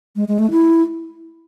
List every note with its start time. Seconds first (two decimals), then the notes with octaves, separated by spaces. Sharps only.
0.16 G#3
0.28 G#3
0.39 A3
0.51 E4